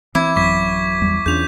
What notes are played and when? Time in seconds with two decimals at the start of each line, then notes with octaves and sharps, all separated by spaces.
0.15 E3 C4 E4 D6 G#6
0.36 A1 F#2 F#3 C#6 D6 B6
1.01 E2 G3
1.26 E2 C#4 D4 F4 G#4 G6 F7